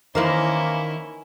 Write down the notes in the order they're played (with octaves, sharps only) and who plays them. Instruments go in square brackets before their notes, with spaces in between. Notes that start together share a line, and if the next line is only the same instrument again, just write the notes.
[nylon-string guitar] D#3 [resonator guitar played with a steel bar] E3 A#4 C5 [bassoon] A#3 [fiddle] C#4 E4